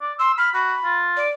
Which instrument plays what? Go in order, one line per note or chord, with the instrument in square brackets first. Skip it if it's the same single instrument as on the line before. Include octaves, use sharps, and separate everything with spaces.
[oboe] D5
[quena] C6 [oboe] E6
[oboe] B5 [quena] F6
[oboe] F#4 [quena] B5
[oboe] F4
[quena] D5